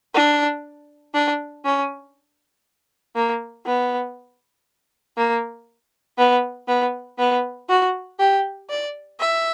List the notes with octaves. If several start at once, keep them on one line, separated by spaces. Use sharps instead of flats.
D4
D4
C#4
A#3
B3
A#3
B3
B3
B3
F#4
G4
D5
E5